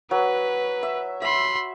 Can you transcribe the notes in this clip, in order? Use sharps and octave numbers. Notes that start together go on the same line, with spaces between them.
F#3 B4
E5
E5 B5 C6